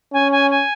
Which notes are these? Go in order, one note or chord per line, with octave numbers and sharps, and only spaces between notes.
C#4 G#5
G#5
G#5